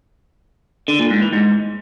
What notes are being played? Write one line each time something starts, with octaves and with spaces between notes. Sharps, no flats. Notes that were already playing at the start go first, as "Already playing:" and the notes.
D3
A#2
G#2
E3
G#2